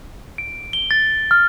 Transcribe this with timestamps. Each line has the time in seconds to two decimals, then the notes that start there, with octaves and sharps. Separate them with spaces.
0.38 D7
0.73 G7
0.91 A6
1.31 F6